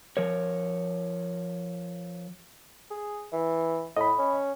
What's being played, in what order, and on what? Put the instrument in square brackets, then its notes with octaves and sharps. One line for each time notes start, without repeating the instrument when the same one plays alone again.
[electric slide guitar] F3 A#4 C#5
[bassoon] G#4
E3
[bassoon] A2 [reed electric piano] D#5 B5
[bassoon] C#4